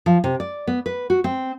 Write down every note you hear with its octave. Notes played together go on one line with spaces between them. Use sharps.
F3
C3
D5
B3
B4
F#4
C4